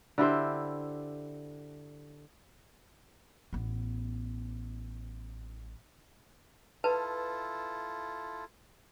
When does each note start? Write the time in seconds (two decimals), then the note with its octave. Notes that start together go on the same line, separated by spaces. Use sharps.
0.18 D3 E4 G4 C5
3.53 A1 B3
6.84 E4 F4 A4 B4 A5